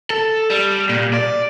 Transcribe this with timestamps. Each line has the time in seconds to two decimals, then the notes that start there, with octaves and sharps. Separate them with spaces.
0.10 A4
0.50 G3
0.89 A#2
1.14 D5